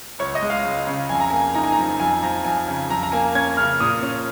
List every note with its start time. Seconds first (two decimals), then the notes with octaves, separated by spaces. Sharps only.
0.19 C#2 C#5
0.35 D#5
0.42 G#3
0.50 F5
0.65 C#2
0.87 C#3
1.09 F2 G#5
1.20 A#5
1.31 A#3 G#5
1.55 D#4 A#5
1.64 G#5
1.72 A#5
1.78 F3
2.00 F2 G#5
2.23 F3 A#5
2.44 F2 G#5
2.68 C#3
2.90 F2 A#5
3.03 A#5
3.12 A#3 G#5
3.35 C#4 G#6
3.57 C#3 F6
3.80 A#2 D#6
4.03 C#4